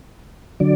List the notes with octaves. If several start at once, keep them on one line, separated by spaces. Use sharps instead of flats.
D3 F#3 D5